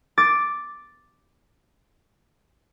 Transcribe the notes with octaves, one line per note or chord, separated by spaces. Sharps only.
D6 A6